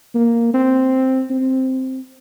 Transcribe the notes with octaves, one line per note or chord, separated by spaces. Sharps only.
A#3
C4
C4